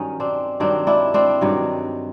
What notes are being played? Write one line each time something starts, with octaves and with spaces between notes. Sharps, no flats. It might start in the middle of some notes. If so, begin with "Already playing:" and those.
Already playing: G2 D#3 F#3 C#4 D#4
C4 D4
G2 D#3 F#3 C4 D4
D4 E4
C4 D4
G2 D#3 F#3